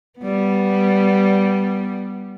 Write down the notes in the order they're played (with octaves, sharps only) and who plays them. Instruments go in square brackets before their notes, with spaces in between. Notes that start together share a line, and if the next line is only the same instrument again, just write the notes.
[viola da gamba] G3 B3